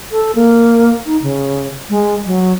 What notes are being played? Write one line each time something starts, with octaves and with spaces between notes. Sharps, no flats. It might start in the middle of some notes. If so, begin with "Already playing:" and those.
A4
A#3
D#4
C#3
G#3
F#3